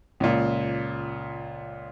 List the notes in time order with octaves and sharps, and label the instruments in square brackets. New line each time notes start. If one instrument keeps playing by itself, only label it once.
[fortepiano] C#2 A#2